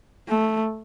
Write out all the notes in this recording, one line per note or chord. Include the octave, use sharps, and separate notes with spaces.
A3